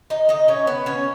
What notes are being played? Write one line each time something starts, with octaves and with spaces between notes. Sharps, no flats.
D#4 D#5
D#4 D#5
C#4 C#5
B3 B4
C#4 C#5